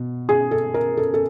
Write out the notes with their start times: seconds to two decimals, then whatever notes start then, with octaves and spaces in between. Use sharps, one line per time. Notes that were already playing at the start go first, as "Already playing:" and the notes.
Already playing: B2
0.29 G#4
0.51 A4
0.74 A#4
0.97 A4
1.14 A4